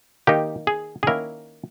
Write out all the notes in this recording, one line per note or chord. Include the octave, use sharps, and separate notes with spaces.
D#3 A#3 D#4 G4
G#4
G#4
D#3 A#3 C#4 E4 A#4